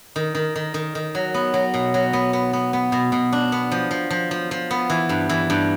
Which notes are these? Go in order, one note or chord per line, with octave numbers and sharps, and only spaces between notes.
D#3
D#3
D#3
D#3
D#3
F#3
B3
F#3
B2
F#3
B3
B3
B3
B3
B2
B2
D4
B3
F3
F3
F3
F3
F3
B3
E3
G2
E3
G2